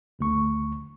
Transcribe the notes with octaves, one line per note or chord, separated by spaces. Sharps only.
G1 D2 C#6